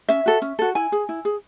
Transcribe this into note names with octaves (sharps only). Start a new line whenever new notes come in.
C#4 E5
F#4 A4
C#4
F#4 A4
E4 G#5
G#4
E4
G#4